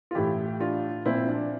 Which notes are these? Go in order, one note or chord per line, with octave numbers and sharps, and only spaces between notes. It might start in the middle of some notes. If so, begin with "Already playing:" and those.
F4
A2 E3 E4 G4
D4 F4
A#2 F3 C4 E4
D4